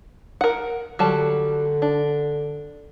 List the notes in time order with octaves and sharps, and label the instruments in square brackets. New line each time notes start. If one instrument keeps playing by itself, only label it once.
[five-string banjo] A#4 F#5
[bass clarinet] D3 [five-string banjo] F#3 G3 A5
[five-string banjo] D4